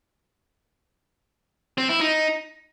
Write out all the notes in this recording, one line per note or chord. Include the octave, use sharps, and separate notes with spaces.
C4
E4
D#4